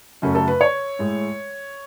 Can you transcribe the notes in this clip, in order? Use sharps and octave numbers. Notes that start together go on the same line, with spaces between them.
F#2 C#3 F#3 A3 C#4
A4
B4
C#5
A2 G#3